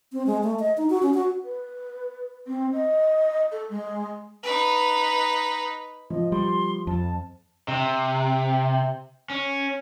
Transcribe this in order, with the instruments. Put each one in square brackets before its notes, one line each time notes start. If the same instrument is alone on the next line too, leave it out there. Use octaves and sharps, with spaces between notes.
[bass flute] C4
G#3
A3
D#5
D#4
F#4
C#4
F#4
[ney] B4
C4
D#5
A4
G#3
[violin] D#4 B4
[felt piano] F3 [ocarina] D#5
[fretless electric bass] G3 [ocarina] C6
[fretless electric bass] F2 [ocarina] A5
[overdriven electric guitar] C3
C#4